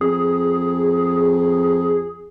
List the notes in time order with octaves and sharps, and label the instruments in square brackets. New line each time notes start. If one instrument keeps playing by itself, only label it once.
[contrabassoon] F2 [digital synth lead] G#4